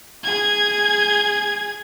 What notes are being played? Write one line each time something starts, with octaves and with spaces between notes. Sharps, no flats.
G#4 G#6